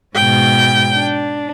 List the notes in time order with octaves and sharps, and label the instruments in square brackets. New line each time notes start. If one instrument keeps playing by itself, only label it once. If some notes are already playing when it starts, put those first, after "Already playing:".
[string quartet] G#2 B2 [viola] G5
[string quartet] D4